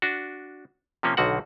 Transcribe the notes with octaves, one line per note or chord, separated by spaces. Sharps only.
D4 F#4
C3 F3 A#3 C#4
B1 D3 D#3 F#4 F#5